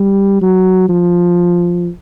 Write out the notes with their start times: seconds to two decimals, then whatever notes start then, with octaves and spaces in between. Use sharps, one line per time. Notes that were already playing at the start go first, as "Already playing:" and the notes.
Already playing: G3
0.42 F#3
0.89 F3